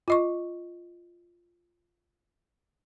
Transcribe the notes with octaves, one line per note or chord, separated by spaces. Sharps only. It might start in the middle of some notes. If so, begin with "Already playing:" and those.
F4 D#5 C#6